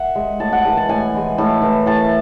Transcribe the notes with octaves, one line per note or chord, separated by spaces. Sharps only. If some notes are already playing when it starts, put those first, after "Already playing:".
Already playing: E5 F#5
G#3
A2 A5
F#5
E3 G#3 A5
A5
A2 G#5
E3 G#3
A2 A5
E3 A3
A2 A5